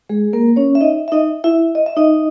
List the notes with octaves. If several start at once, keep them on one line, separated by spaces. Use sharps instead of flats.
G#3 G#4
A#3 A#4
C#4 C#5
E5
D#4 D#5
E5
D#4 D#5
E4 E5
D#5
E5
D#4 D#5